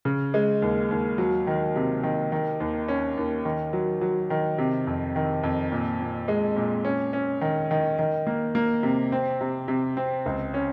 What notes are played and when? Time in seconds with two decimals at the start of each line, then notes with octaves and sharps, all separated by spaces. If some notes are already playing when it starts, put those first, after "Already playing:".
0.05 C#3
0.34 G#3
0.62 D#2
0.91 D#2
1.18 F#3
1.47 D#3
1.76 C3
2.03 D#3
2.32 D#3
2.60 D#2
2.88 C#4
3.17 D#2
3.45 D#3
3.73 F#3
4.01 F#3
4.30 D#3
4.58 C3
4.87 F2
5.16 D#3
5.43 F2
5.72 A#2
6.01 A#2
6.28 G#3
6.56 A#2
6.85 C#4
7.13 C#4
7.41 D#3
7.71 D#3
7.99 D#3
8.27 A#3
8.55 A#3
8.83 C3
9.12 C4
9.41 C3
9.68 C3
9.97 C4
10.26 C#2
10.54 C#4